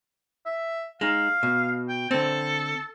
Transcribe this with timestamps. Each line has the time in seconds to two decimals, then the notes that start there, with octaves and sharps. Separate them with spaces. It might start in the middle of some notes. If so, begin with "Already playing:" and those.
0.46 E5
1.01 G#3 D#4 F5
1.43 B2
1.89 G5
2.11 D3 C4 A4